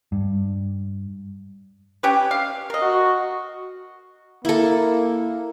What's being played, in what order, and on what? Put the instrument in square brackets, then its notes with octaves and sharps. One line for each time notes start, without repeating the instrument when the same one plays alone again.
[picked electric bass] G2
[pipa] C#4 G4 B4
F5
A#4 D#5
[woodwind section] F#4
[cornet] A#3 [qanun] E4 A4